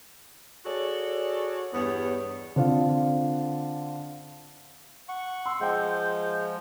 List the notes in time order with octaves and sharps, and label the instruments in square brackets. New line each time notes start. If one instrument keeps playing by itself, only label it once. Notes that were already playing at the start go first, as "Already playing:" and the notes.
[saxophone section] F#4 G#4 A4 C#5 D5
E2 G2 B3 C#5
[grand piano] D3 C4 F4
[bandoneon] F#5 C#6
[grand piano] C6 [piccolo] E6
[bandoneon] F3 [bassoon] G#3 [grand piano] F#5 G5 [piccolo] G6